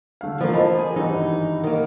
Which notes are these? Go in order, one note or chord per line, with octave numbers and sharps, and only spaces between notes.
D3 A3 F5
E3 F3 A3 A#3
D#5 A5 B5
G#4
G#1 G2 E3 D#4
D#3 A#3